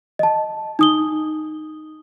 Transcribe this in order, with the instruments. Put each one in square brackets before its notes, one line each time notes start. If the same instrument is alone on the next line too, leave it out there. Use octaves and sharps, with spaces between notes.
[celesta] D#5 A5
D#4 D#6 G7